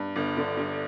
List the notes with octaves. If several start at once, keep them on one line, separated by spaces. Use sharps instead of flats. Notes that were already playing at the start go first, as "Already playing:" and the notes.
Already playing: G2
G1
D3
G2